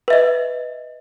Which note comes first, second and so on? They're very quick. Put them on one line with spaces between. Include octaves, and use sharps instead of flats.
B4 E5 D#5